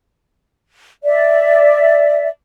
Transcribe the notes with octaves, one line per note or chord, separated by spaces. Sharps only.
D5 E5